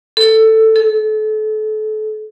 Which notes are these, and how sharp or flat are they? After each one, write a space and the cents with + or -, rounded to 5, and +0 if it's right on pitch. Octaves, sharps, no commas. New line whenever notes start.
A4 +10
A4 -30